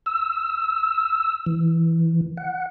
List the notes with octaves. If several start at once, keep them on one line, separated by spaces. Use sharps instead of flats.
E6
E3
F#5